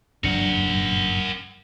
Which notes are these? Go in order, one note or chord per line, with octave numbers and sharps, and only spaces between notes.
F#1 G2 D4 A#4 F#5